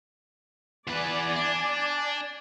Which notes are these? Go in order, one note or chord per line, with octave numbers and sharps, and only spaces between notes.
E2 B4 D5 G#5
D4